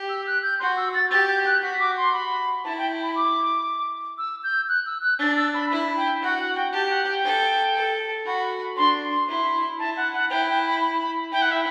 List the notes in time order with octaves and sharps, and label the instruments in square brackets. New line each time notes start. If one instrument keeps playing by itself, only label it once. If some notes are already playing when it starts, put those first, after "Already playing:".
Already playing: [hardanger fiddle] G4
[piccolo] E6
F#6
G6
[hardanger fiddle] F#4 [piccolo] C6
[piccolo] E6
A6
[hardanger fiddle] G4 [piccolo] A6
[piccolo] G6
F#6
[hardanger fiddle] F#4 [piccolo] B6
[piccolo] D6
C6
B5
[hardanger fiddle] E4 [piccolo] A5
[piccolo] G5
B5
D6
E6
G6
F#6
E6
F#6
[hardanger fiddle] D4 [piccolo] A6
[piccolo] E6
B5
[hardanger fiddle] E4 [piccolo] B5
[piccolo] G5
[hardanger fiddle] F#4 [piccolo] F#5
[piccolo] F#5
G5
[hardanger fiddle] G4 [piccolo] A5
[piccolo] G5
F#5
G5
[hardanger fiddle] A4
A4
[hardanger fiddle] F#4 [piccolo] B5
[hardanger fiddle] D4 [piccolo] C6
[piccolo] C6
[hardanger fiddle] E4 [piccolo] C6
[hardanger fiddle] E4 [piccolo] A5
[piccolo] F#5
F#5
[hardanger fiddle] E4 [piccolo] G5
[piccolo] G5
B5
B5
B5
[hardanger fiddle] E4 [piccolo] G5
[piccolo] F#5
E5